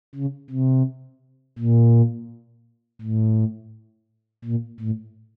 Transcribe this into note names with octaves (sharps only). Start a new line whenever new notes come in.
C#3
C3
A#2
A2
A#2
A2